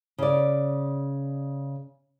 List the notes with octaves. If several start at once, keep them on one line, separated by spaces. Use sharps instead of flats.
C#3 D5